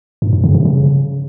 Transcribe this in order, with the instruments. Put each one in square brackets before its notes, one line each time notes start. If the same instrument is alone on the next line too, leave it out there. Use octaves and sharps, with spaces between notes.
[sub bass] G2
G2
C#3
C3
C#3